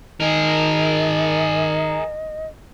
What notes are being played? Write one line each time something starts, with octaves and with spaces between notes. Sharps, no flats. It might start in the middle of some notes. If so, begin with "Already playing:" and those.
D#3 G#4 A#4 D#5